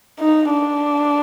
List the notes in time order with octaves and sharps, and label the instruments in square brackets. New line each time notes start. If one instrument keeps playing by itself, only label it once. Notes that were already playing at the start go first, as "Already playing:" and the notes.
[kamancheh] D#4
D4